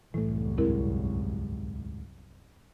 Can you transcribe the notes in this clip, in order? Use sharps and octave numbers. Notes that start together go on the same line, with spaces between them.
C2 F#2 A2 E3 A3
D2 G#2 G#3 C4 E4 A#4